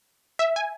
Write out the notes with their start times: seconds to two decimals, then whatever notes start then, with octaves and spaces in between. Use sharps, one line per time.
0.39 E5
0.56 G#5